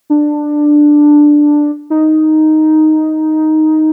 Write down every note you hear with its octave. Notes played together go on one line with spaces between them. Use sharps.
D4
D#4